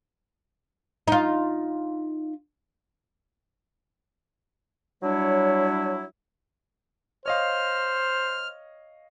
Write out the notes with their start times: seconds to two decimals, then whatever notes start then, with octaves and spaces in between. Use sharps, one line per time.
1.08 D#4 F4
5.02 F#3 G3 D4 E4 C#5
7.26 C5 C#5 D#5 F5 F6